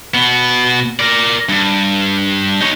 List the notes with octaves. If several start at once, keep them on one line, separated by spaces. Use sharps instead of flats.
B2 B3
A#4 D5
G2
D#4 C#5